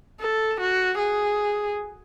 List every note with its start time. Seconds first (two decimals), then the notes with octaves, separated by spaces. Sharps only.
0.21 A4
0.60 F#4
0.98 G#4